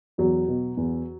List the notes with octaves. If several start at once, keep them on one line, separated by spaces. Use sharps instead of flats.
E2 F#3
B2
E2